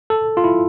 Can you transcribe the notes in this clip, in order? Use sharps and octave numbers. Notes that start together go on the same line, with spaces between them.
A4
F4
E4